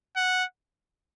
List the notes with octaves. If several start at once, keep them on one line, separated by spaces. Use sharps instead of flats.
F#5